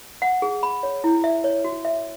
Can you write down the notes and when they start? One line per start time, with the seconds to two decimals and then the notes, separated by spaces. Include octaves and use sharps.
0.22 F#5
0.42 G#4
0.63 B5
0.83 C#5
1.04 E4
1.24 E5
1.44 C#5
1.64 F#4
1.85 E5